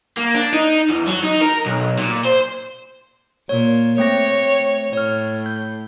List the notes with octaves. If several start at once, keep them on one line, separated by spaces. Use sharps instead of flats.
A#3
D4
D#4
E2
F#3
D#4
A#4
B1
A#2
C5
A#2 C#5
A3 C4 C#5 A#6
A2 C#5 F6
G6